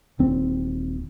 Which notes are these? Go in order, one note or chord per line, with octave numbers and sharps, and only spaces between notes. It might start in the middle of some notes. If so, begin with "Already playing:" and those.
D#1 C4